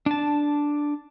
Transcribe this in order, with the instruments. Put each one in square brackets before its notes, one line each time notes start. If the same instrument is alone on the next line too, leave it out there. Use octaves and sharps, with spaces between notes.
[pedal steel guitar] D4 A5